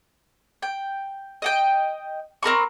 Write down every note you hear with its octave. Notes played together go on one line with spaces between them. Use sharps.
G5
D#5 F#5 G5
C4 A#4 B5 C#6